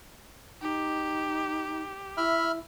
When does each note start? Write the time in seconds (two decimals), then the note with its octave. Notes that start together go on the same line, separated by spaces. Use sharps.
0.62 D#4 G4
2.17 E4 E5 B5 F6